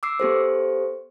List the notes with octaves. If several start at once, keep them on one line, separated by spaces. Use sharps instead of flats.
D6 E6 C7
B3 G4 A4 C5